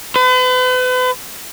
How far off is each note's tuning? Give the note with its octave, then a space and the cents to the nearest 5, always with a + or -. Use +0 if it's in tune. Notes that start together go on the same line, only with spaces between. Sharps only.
B4 +40